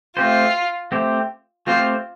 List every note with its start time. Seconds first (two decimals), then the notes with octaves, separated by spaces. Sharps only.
0.17 A3 C4 F4 G4 C5
0.92 A3 C4 G4 C5
1.67 A3 C4 F4 G4 C5